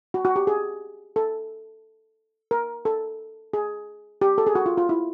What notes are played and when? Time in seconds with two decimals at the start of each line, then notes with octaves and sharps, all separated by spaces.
0.14 F#4
0.25 F#4
0.36 G4
0.47 G#4
1.16 A4
2.51 A#4
2.85 A4
3.53 G#4
4.21 G4
4.38 A4
4.47 G#4
4.55 F#4
4.66 F4
4.77 F4
4.89 E4